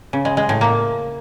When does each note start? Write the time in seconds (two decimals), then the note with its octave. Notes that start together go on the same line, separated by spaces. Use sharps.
0.13 C#3
0.25 G#3
0.37 G#3
0.49 A2
0.61 A#3